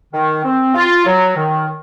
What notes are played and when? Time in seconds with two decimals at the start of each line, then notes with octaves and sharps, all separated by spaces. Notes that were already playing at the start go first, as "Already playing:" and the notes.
0.13 D#3
0.44 C4
0.75 F4
1.06 F#3
1.37 D#3